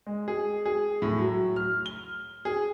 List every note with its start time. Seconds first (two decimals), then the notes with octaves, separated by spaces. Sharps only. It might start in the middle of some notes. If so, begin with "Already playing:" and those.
0.07 G#3
0.28 G#4
0.65 G#4
1.02 A2
1.18 F#3
1.56 F6
1.86 G7
2.45 G#4